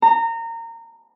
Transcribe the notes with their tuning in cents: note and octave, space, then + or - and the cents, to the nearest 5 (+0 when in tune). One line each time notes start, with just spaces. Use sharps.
A#5 -25